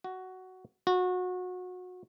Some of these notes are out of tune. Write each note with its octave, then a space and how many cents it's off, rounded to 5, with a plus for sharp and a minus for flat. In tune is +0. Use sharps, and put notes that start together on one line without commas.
F#4 +10
F#4 -25